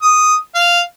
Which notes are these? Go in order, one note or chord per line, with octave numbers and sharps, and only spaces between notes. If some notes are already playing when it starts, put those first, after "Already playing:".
D#6
F5